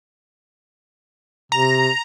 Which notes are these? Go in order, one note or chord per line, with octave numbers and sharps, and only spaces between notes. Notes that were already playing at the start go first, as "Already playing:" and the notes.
C3 A#5